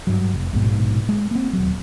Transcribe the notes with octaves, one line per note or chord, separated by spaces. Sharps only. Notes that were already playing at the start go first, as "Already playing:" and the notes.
G2 F#3
F1
A#1 G#2 B2
G#3
A#3 C4
D#1 F#3